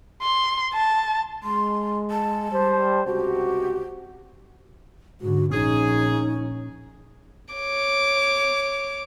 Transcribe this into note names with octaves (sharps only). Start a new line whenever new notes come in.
C6
A5
G#3 C6
A5
G3 C5
C#2 C3 F#4 G4
G#2 D3 F#4
A#1 C#4 D#4 G#4
C#5 D6